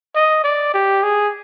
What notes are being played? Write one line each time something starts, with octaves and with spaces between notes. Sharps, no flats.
D#5
D5
G4
G#4